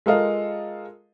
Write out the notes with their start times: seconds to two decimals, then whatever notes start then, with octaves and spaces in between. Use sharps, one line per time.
0.06 G#3 F4 A4 A#4 D#5 F5